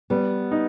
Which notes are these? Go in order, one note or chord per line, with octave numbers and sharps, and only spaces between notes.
G3 B3
D#4